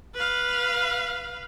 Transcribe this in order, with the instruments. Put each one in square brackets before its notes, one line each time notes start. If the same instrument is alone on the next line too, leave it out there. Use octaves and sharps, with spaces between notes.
[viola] B4 F5